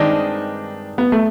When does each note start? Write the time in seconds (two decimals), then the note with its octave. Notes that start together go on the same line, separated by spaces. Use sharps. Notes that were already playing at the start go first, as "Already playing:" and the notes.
Already playing: G2 D#3 G#3 C4 D4 D#4
0.98 B3
1.12 A3